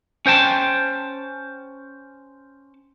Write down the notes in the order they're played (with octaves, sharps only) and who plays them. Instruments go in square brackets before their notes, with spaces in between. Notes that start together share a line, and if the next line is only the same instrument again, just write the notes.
[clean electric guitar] C#4 C5 G5 A5